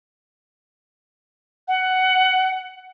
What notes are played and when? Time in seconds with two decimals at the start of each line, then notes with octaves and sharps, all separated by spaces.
1.68 F#5